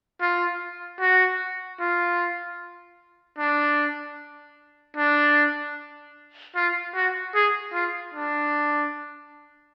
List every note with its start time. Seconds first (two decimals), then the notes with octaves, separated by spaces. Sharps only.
0.21 F4
1.00 F#4
1.80 F4
3.38 D4
4.97 D4
6.56 F4
6.95 F#4
7.35 G#4
7.73 F4
8.14 D4